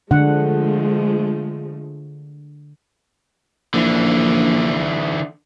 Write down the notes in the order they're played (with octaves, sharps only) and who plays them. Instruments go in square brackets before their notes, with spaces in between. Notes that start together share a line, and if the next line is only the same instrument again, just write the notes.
[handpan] D3 D4 F#5 [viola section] F3 G#3 A3
[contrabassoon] A#1 [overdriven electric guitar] D3 E3